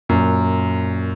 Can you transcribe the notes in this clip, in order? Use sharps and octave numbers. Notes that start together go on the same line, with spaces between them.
F#2 A#2